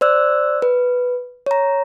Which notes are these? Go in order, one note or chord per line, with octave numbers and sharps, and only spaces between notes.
C5 D5 E6 F#6
B4
C#5 A#5